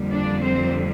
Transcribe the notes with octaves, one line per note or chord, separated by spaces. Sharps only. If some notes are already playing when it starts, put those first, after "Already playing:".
Already playing: F2 D3 G3 A#3
D4 D5
C4 C5